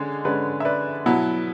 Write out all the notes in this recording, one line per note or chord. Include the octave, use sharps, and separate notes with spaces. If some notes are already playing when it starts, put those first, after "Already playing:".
Already playing: D3 G#3 C#4
D3 G#3 C#4 B4 D5
E5
B4 D5
B2 F#3 B3 E4